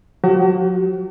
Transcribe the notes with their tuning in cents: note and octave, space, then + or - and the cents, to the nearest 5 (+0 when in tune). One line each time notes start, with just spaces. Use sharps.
F#3 -40 F#4 +45